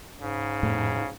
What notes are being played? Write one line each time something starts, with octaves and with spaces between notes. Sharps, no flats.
G#2 C#3
F2 A2 A3